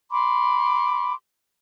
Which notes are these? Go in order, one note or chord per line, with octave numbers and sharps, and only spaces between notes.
B5 C6 D6